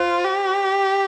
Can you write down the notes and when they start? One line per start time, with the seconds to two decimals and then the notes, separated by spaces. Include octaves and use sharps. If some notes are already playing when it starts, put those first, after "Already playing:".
Already playing: F4 C5
0.25 G4